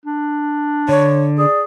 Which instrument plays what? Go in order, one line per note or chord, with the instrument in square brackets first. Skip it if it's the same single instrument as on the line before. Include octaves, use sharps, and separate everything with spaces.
[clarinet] D4
[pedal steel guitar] D3 [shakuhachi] C#5
[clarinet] G#4 [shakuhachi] D5